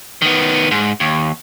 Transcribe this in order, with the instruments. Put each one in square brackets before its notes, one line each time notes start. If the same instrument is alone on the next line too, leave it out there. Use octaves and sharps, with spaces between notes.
[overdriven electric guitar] D#3 B3
G#2
D#2